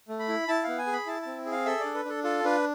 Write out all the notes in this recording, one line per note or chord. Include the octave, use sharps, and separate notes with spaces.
A3
B5
E4
E4 A5
B3 F5
G#5
G#4
B5
E4 A5
C4 A5
G#4
F5
A4 E5
D4 D5
B4
D4 A4
F4 A4
D4 B4